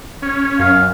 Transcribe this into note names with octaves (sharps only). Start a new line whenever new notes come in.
C#4
F#2 F5